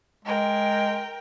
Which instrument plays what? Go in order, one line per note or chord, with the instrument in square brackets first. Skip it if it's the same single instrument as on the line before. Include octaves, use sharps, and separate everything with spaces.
[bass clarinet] G#3 [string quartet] A#4 G5